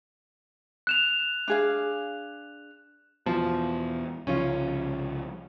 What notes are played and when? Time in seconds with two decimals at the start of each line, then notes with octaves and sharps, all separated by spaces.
0.87 F#6 E7 F7
1.48 D4 G#4 F5
3.26 E2 B2 F3
4.27 C2 C#3 F3 C#4 F4